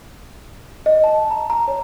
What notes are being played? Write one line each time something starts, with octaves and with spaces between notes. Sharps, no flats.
D#5
A5
A#5
A#5
C#5